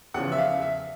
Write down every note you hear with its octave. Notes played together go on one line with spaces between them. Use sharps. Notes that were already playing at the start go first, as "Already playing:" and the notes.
E2 C#3 F3 F#5
E5
F5
E5